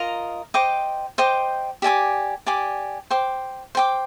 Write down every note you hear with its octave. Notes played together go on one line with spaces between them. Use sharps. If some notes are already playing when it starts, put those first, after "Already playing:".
Already playing: F4 A#4 D#5 A#5
C5 D#5 G5 D6
C5 D#5 G5 D6
G4 D5 G#5 D6
G4 D5 G#5 D6
C5 G5 D6
C5 G5 D6